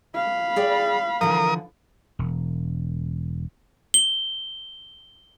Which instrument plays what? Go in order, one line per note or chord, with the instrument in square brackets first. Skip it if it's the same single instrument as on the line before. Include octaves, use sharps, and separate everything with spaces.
[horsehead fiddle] F5 B5
[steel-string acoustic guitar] G#4 D5 G5
[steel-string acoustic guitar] D3 E3 F3 [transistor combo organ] A#4 D#6
[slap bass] E1
[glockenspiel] G7